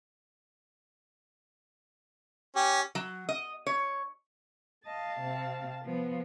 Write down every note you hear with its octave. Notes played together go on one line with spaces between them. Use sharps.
C#4 G4
F#3
D#5
C#5
D#5 F5 A5
C3 C4
F3 B3